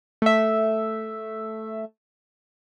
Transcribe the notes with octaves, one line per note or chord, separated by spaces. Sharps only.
A3 E5